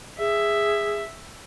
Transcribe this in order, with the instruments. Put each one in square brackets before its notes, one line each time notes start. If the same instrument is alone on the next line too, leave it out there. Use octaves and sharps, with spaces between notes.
[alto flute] G#4 [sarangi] E5